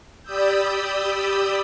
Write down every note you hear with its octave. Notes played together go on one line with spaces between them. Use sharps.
G4 D5 B5 D#6 E6 G6